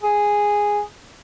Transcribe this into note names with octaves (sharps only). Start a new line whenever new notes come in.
G#4